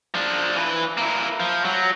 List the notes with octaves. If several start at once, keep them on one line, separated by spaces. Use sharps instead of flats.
F3 D4
E3 B4
A#3 E4
F3
F#3